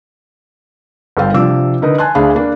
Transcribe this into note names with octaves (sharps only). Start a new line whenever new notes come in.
G1 A4 F5 G5
C3 F3 D4 D6 E6
D3 D#4 A#4 B4 D#5
G#5 A5 C6 F#6
D2 D4 G#4 F5 B5
A#3 D4